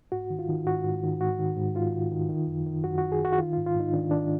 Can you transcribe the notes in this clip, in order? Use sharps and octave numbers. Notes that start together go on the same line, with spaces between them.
G#2 F#4
D#3
F4
D#3
G#2 F#4
G#2
D#3
G#2 F#4
D#3
G#2
G#2 F4
D#3
D#3
D#3
F#2
D#3
F#2 F#4
D#3 F#4
G#4
D#3 F#4
F#4
D#3 F4
G#2 F4
F4
G#2 D#4
D#3 D4
D#3 D4